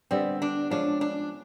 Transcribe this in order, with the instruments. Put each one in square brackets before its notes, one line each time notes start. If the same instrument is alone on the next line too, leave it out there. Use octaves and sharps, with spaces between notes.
[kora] D3 G3 B3 [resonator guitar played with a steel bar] C4
[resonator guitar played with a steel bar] D4
[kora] F3 G#3 C#4 [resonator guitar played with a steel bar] D4
[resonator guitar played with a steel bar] D4